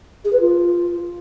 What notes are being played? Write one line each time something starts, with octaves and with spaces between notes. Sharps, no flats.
G#4
B4
F4